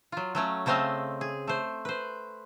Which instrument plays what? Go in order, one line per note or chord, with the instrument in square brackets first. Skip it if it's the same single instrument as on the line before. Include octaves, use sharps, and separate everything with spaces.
[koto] F#3 F4
F#3 A3 C#4
C#3 A3 C4 D#5 F5 A5
G#4
A3 C5
B4 C5